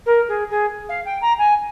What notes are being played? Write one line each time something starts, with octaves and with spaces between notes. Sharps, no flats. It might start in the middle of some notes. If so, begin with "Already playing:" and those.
A#4
G#4
G#4
F5
G5
A#5
G#5